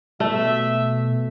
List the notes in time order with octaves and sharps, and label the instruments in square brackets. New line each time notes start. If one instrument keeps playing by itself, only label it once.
[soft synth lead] B2 [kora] A3 [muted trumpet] E5